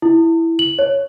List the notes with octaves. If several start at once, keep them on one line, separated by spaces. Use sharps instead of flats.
E4
F#7
C#5